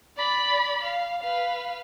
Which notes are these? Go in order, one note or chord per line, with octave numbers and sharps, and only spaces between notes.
D5 B5
F5
B4 F5